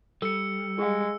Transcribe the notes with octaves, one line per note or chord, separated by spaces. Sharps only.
G3 A4 E6 C#7
G#3 G#4 F5